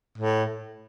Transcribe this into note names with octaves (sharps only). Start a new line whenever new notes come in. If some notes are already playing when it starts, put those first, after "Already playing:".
A2